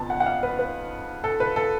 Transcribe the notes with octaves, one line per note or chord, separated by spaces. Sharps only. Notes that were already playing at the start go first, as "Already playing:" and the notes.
Already playing: F2 C#3 B3 A5
F#5
F#5
F5
B4
B4
A4
B4
A4